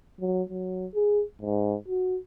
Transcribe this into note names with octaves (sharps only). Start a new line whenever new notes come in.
F#3
F#3
G#4
G#2
F#4